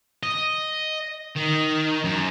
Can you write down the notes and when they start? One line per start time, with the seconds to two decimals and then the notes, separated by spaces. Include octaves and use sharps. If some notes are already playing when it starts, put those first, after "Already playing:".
0.23 D#5
1.36 D#3
2.05 F#2